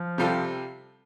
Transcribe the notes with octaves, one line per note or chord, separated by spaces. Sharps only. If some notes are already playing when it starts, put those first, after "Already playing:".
Already playing: F3
C3 G3 F4 A4